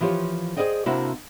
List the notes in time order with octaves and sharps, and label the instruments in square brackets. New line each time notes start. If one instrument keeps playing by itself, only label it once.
[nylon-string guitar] E3 F3 F4 G4 C#5
G#4 A#4 C5 D5 D#5 G5
C3 A#3 D4 E4 F#4 C5